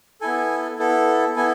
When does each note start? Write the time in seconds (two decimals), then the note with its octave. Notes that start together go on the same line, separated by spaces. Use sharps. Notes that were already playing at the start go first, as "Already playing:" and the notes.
0.21 B3 E4 A4 G#5
0.79 B3 E4 A4
1.36 B3 E4 A4 G#5